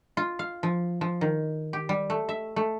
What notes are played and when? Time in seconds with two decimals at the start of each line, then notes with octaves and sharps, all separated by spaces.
0.17 F4
0.39 F5
0.63 F3
1.01 F3
1.21 D#3
1.73 G4
1.89 G3
2.10 A3
2.29 E5
2.56 A3